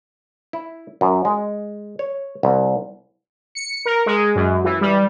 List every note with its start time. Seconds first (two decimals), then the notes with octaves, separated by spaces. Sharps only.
0.53 E4
1.01 F#2
1.25 G#3
1.99 C#5
2.43 C2
3.55 C#7
3.85 A#4
4.06 G#3
4.36 F#2
4.64 E3
4.81 G3